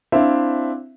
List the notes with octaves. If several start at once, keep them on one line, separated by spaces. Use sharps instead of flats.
C4 D4 E4 E5 F5